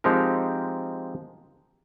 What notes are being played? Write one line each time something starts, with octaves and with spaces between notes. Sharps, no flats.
F3 G#3 C4 D#4 G4 A#4